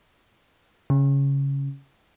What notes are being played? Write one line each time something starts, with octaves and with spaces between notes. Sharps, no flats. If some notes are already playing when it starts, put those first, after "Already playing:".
C#3